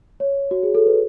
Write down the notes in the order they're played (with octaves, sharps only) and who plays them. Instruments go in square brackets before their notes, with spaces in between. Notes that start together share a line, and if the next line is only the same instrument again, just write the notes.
[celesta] C#5
F#4
G#4
A4
B4